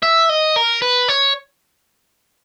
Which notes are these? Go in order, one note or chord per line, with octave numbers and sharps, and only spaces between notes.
E5
D#5
A#4
B4
C#5